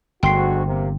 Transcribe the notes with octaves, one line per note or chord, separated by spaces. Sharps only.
G1 D2 G#2 F#4 G5 C6 C7
C3 A#3